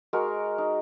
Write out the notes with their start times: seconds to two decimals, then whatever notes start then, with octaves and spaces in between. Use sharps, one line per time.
0.13 G#3 F#4 A#4
0.58 D#4